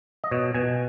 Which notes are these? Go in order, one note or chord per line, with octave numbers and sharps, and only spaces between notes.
D#5
B2 C#5
B2 G#5